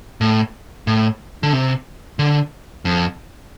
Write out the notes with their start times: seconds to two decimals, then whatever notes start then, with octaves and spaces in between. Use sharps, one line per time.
0.21 A2
0.87 A2
1.43 D3
1.53 C3
2.19 D3
2.85 F2